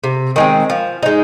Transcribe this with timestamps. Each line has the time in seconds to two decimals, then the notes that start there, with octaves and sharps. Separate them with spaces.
0.04 C3
0.36 D#3 G#3 C4
0.70 F3
1.03 G#3 D#4